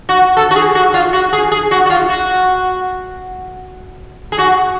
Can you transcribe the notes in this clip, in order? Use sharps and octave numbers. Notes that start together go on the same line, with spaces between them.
F#4
A4
F#4
G#4
F#4
F4
F#4
G#4
G#4
F#4
F#4
F4
F#4
G#4
F#4